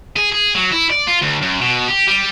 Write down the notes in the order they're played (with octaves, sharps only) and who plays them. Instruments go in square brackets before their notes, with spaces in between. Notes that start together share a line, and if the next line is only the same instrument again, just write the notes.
[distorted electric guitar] G#4
G#4
F#3
E4
D5
F4
D2
F#2
B2
G4
G3